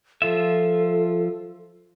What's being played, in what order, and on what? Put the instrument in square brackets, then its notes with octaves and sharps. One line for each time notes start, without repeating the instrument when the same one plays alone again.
[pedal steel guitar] F3 F4 E5 [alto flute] A4